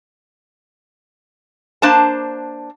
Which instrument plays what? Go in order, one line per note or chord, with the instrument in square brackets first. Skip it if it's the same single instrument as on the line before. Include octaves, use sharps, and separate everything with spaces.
[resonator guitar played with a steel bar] A#3 D4 C5 A5